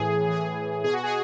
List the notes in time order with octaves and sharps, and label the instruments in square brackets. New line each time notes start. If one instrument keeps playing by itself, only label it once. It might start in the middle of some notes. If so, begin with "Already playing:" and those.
Already playing: [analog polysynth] A2 E3 G#4
A2 E3 G#4
B2 G#4
F#4
G#4